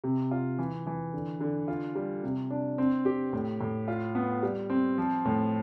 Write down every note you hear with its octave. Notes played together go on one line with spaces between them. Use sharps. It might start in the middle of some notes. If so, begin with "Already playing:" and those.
C3
F4
E3
E3
D3
D3
F4
G3
C3
D4
C4
G4
A2
A2
F4
B3
G3
C4
F3
A2